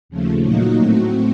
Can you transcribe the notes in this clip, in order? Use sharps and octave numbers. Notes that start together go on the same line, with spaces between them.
D#2 C#3 F3 A3
A#2 F#3 A#3 D#4 F#4
A2 A3 C4 F#4